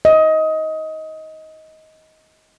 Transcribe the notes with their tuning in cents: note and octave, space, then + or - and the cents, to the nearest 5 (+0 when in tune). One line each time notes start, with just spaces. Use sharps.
D#5 +20